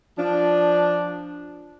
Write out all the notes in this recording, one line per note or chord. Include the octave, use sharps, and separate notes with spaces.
F3 D4